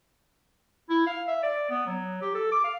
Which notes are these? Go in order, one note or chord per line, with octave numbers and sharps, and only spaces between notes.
E4
F5
E5
D5
B3
F#3
G4
A4
D6
F5